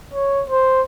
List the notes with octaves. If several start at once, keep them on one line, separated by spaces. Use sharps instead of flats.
C#5
C5